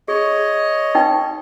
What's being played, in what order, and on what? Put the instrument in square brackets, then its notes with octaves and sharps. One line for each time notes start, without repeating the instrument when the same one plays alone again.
[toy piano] G#4 [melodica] C#5 D#5
[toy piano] D#4 B4 G5